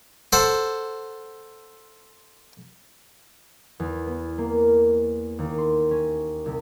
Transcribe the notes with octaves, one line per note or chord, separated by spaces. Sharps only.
A4 C5 F#5
E2
B3
A#3
D#2
C6
C#4
C2